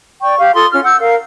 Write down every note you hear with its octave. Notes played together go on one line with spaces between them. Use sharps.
D5 G5 C#6
G4 F5
F4 A4 C6 D#6
C#4 F4 F6
F#5 E6 G6
A#4 F5